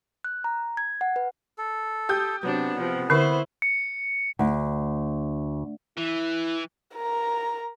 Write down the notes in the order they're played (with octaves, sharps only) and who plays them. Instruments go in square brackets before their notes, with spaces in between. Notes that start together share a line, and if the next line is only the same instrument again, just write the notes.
[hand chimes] F#6
A#5
G#6
F#5
B4
[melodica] A4
[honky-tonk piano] G4 D#6 G6
[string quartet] C3 D4 [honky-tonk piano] F#3 [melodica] B3
[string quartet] C3 F3
[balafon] D3 [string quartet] E4 C5 [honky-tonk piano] B4 C#6 C7
[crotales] C#7
[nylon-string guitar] D2
[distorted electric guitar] E3 [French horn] E4
[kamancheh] A#4 A#5